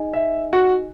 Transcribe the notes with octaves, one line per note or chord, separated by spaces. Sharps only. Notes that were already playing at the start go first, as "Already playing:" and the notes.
Already playing: D#4 G#4 D#5 G#5
E5
F#4